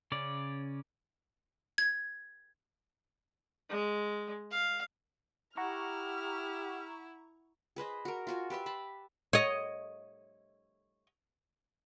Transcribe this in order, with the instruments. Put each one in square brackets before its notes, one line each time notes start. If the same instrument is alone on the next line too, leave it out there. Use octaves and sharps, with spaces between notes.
[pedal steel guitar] C#3 C#4 D5
[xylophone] G#6
[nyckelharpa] G#3
F5
[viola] E4 [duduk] G4 [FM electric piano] F#5 A#5 C#6 [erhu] F6
[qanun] G#4 B4 C5 D#5
F#4 A#4
F4 F#4 G#5
G4 B4 E5 C6
A5 B5
[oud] C#5 D#5